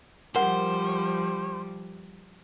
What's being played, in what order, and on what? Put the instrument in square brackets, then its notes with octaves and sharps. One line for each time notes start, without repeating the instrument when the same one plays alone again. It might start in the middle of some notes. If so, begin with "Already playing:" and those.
[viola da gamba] F3 G3 [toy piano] A#4 F#5 [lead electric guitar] C5